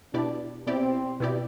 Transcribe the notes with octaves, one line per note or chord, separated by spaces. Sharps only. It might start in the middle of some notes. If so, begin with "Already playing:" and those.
B2 B3 D4 E4 G4 D5
B2 B3 C4 E4 G4 D5
B2 B3 E4 G4 D5